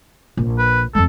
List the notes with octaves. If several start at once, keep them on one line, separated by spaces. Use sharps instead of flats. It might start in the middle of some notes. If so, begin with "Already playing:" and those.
A#1
B4
F2 G#3 A4